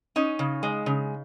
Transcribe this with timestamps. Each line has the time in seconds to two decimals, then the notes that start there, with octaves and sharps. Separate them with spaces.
0.16 C#4 D#4
0.39 C#3
0.63 G#3
0.86 C#3